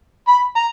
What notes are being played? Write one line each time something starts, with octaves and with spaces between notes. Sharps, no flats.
B5
A#5